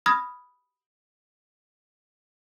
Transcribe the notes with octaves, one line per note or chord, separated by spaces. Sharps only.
B5 D#6 F6 G#6 A#6